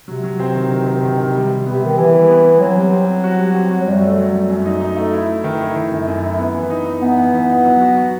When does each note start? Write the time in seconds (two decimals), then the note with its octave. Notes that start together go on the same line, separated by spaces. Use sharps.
0.07 C3 F#3
0.24 F#3
0.39 C4
0.55 D#3
0.70 D#3
0.87 D#3
1.03 D#3
1.18 D#3
1.34 G3
1.50 G3
1.66 B3
1.73 C3
1.82 D#3 G3
1.97 E3 E4
2.13 G3
2.28 B3
2.44 B3
2.60 F#3 C4
2.77 G3
2.91 C4
3.07 C4
3.24 F#4
3.39 G3
3.54 C4
3.71 F#4
3.81 F#3
3.86 F#2 G3
4.02 A3
4.18 F#3
4.34 F#3
4.49 F#2
4.65 D#4
4.81 D#4
4.96 A3
5.13 E4
5.29 E4
5.44 D#3
5.61 E4
5.75 D#3
5.92 F#2
6.08 F#2
6.23 E4
6.38 B3
6.55 E3
6.70 D#4
6.86 D#4
7.02 E3 B3
7.18 E3
7.34 E3
7.49 D#4
7.65 F#3
7.81 F#4
7.97 F#4